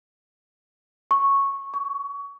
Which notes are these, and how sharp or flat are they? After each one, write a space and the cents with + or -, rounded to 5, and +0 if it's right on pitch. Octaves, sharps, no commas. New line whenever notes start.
C#6 -5
C#6 +25